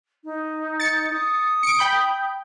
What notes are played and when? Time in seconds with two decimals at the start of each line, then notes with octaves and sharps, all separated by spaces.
0.24 D#4
0.80 A6 C#7
1.13 D#6
1.63 C#7 D7
1.79 G5 B5 G6